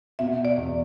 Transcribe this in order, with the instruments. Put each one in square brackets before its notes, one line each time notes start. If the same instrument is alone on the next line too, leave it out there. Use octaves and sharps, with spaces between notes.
[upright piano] B2 [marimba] E5
[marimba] D5
[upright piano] E2